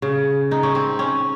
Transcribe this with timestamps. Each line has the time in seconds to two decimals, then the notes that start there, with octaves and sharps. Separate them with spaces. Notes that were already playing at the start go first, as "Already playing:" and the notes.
0.02 C#3
0.51 D#4
0.63 C#4
0.75 C4
0.99 C#4